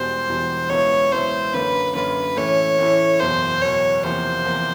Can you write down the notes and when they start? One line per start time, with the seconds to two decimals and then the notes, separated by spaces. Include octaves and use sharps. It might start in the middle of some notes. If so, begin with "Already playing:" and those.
Already playing: E1 E2 B2 G3 C5
0.29 E1 E2 B2 G3
0.70 C#2 B2 F#3 B3 E4 C#5
1.12 C#2 B2 F#3 B3 E4 C5
1.54 F#2 D3 F#3 A#3 C#4 B4
1.95 F#2 D3 F#3 A#3 C#4 B4
2.36 A2 E3 A3 C#4 E4 C#5
2.78 A2 E3 A3 C#4 E4
3.20 F#1 E2 B2 C5
3.61 F#1 E2 B2 C#5
4.03 E2 C3 F3 A#3 C5
4.45 E2 C3 F3 A#3